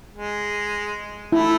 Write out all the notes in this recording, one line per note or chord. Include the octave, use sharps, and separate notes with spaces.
G#3
A3 E4